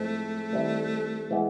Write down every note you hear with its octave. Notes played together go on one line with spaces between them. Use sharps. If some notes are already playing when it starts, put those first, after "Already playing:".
Already playing: A2 F3 G#3 A3 C4
D#3 G3 C4 E4
E3 G#3 B3